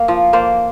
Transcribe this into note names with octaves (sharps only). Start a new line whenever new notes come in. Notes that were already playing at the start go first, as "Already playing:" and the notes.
Already playing: A#3
F3
A#3 C5 D5